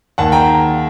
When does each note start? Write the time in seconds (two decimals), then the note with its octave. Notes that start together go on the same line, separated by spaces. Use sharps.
0.18 D#2 F#5 A5
0.32 G5 A#5